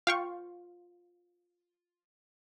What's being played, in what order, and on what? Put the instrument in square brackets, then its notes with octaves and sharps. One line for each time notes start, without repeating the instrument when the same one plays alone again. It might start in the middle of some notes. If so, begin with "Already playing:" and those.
[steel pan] F4 [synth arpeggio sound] F5 G5 C#6